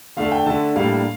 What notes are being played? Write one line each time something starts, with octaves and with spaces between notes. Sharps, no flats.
D3 A3 D4 F5
G5
D3 A3 D4 A5
A2 G3 A#3 D4 F5